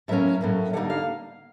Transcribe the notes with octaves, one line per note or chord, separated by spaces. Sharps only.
A2 F#3 A#3 C#4 E5
A2 F#3 A#3 C#4
D3 G3 A#3 D#4 F#5
F5